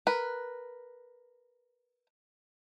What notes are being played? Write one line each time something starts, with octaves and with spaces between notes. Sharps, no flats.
A#4 B4